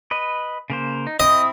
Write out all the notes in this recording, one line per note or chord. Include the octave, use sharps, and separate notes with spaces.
B4 D#5
C#3 A#3 C5
D#4
C4 E4 D#5 D#6